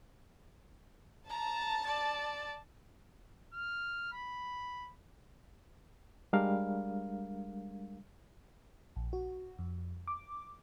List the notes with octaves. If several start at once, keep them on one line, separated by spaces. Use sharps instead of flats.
A5 A#5
D5
F6
B5
G3 G#3 D4 A#4 F5
A#1
F#4
F2
D6